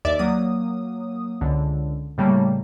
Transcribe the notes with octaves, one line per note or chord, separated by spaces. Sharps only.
D#2 D5 E5 D6 A6
F#3 A#3 D#6
C#2 D3
A2 C#3 G3 A3 A#3